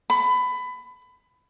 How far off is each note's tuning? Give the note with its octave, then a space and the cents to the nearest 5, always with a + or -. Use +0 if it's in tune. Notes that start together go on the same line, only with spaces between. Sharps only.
B5 +20